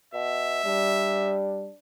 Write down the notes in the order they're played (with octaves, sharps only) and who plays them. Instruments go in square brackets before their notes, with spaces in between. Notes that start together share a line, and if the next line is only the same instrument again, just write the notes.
[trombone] B2 [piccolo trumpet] E5
[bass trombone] G3 [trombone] D4